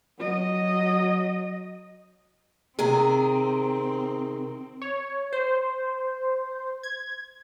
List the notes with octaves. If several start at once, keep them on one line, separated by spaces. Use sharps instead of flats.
F#3 D#5
C3 D#3 C4 G#4
C#5
C5
G#6